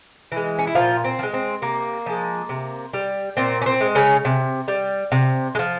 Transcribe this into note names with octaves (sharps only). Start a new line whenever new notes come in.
E3 G#3
C#4
E4
A#2 F3 F4
C4
F3
G#3
C4
C3 A#3
F3 G#3
C3
G3
A#2 C4
C#4
C4
G#3
C#3 C#4
C3
G3
C3
G#3
F3